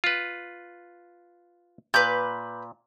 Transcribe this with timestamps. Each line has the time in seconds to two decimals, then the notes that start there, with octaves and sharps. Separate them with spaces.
0.04 F4 B4
1.94 A#2 B4 G6